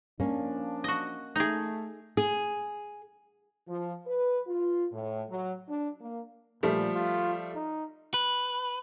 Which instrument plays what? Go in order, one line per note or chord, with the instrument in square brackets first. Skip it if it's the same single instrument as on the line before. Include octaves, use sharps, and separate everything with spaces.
[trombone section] F3 D4 [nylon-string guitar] A#3 C#4
[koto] F#4 D#5
[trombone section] A3 [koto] D#4 G#4
[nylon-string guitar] G#4
[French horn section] F3
B4
F4
A2
F#3
D4
A#3
[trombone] A#2 [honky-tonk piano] F3 G3 A3
[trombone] F4
D#4
[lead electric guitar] B4